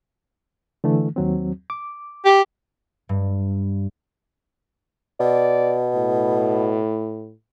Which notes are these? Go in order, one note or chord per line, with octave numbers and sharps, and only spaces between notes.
D3 E3 A3
D#2 F#3 C4
D6
G4
G2
B2 D5
A2